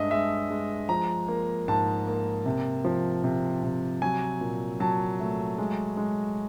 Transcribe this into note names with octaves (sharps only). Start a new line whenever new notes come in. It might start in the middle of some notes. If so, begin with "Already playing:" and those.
Already playing: G2 G#3 D#5 E5
G#3 E5
G#3
F3 A#5
A#3
G#2 A5
A#3
C3
F3
C3
C3
F#3 G#5
A#2
F#3 A5
A3
G#3
G#3